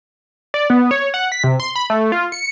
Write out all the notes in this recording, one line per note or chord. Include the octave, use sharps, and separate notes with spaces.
D5
B3
C#5
F#5
B6
C3
C6
B5
A3
F4
C#7